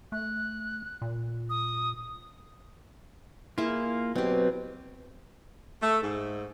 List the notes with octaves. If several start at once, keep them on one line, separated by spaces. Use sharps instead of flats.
A3 F#6
A#2
D#6
A#3 E4 F4 G#4 E5
B2 F#3 C4 G4
A3
G#2